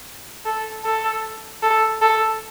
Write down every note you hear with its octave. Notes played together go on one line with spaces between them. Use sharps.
A4
A4
A4
A4